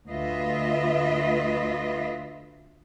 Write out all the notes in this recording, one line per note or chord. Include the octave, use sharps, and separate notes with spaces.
D2 F4 B4 D#5 E5